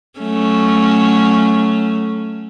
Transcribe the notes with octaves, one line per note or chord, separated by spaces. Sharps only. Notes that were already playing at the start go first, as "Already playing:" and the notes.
F#3 A3 C#4